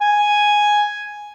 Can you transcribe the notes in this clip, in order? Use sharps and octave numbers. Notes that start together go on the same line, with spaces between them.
G#5